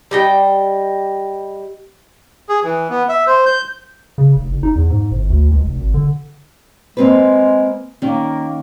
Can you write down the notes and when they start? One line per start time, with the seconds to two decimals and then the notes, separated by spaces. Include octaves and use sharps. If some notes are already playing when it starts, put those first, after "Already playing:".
0.11 G3 D#5 G5
2.49 G#4
2.64 E3
2.90 B3
3.09 E5
3.27 C5
3.46 G6
4.18 C#3
4.36 F1
4.50 F#1
4.63 D#4
4.75 E2
4.90 G#2
5.12 G1
5.30 D2
5.51 C#2
5.64 F1
5.78 G#1
5.94 D3
6.97 G#3 A#3 C4 B4
8.02 D#3 A#3 C#4